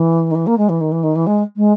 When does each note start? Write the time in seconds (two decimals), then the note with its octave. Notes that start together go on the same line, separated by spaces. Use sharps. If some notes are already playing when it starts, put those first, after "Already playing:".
Already playing: E3
0.31 D#3
0.35 E3
0.47 A#3
0.58 G#3
0.69 E3
0.81 D#3
0.92 E3
1.03 D#3
1.15 E3
1.27 G#3
1.57 G#3